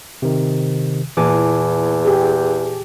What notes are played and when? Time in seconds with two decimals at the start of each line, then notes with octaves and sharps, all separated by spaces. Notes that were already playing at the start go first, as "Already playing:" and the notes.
0.22 C3 D#3
1.17 E2 A#2 E3 G#5 A5 D6
2.05 G4 G#4